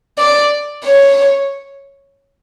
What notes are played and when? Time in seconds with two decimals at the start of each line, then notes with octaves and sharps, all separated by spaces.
0.18 D5
0.85 C#5